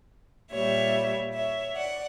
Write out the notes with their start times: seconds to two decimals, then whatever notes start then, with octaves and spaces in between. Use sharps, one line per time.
0.51 A#2 G3 C#5 E5
1.34 C#5 E5
1.76 D5 F#5